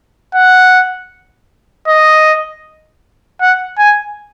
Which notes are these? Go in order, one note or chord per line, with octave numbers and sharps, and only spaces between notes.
F#5
D#5
F#5
G#5